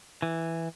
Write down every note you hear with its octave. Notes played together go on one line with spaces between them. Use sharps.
E3